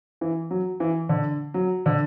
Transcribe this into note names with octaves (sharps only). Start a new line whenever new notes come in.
E3
F#3
E3
D3
F#3
D3